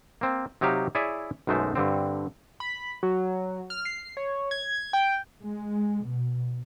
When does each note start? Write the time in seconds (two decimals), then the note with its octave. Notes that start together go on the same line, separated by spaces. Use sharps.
0.21 A#3 C4
0.61 C3 F#3 D#4 G4 F5
0.95 E4 G#4 C#5 D5 E5
1.47 B1 F#2 G#3 A3 C5
1.75 G2 D3 C4
2.60 B5
3.03 F#3
3.70 F6
3.85 C7
4.17 C#5
4.51 G#6
4.93 G5
5.42 G#3
6.06 B2